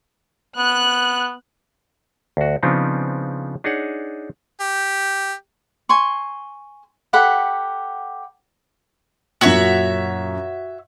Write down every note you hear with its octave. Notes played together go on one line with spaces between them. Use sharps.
B3 F#6
D2 F#4
C#3 F3 B3 C4 D4 D#4
D4 D#4 G#4 C#5 F#5
G4
G#5 C6 C#6
G4 A4 F#5 B5
F#2 A#2 F#4 C#5 E5